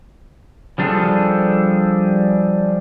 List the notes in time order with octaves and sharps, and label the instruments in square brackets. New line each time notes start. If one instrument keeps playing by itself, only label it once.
[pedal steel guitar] F3 G3 D4 G#4 A4